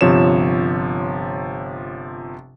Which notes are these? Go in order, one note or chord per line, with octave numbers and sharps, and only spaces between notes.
G1 C3 F3 C#5 E7